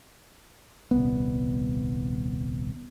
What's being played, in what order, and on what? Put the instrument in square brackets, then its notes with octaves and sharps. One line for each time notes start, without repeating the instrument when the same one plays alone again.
[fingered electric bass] D#1 C2 B3